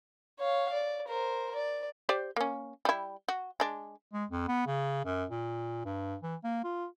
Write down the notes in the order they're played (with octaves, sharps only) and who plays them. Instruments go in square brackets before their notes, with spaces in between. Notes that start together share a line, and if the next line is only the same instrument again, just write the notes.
[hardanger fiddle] C#5 F5
D5
A#4 C5
D5
[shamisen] G4 C5 D5
A#3 C#4
G3 E4
F#4
G#3 D4
[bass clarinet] G#3
F2
B3
C#3
F#2
A#2
G2
E3
A#3
F4